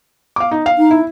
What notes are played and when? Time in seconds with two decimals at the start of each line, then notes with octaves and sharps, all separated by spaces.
0.36 F5 D6
0.51 D#4
0.66 F5
0.78 D#4
0.91 E4